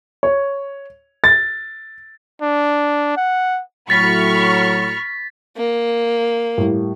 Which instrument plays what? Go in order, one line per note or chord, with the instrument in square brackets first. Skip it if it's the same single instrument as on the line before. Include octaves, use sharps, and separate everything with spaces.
[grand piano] C#5
A6
[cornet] D4
F#5
[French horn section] A2 F#3 [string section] B5 C#6 F6 [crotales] A6 B6
[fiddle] A#3
[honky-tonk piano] A2 G3